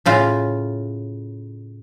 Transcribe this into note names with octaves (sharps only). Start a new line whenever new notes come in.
A2 C#3 F4